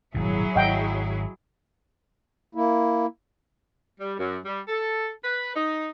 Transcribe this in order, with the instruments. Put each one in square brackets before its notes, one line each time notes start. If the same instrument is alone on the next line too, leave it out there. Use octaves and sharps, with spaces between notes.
[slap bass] D#1 G#1 B2 [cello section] F#3 E4 G#4
[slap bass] G#1 [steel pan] D#5 F#5 G5
[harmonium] A#3 E4
[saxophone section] G3
F#2
G3
A4
B4
D#4